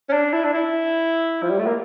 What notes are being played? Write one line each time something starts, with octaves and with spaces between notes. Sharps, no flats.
C#4
D4
E4
D4
E4
F3
G3
A3
A#3